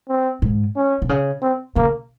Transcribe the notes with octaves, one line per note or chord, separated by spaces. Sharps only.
C4
G#2
C#4
C3
C#3
C4
C#3 A#3